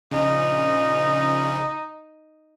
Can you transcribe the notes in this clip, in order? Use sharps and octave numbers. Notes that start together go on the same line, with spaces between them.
A#1 C#3 D#4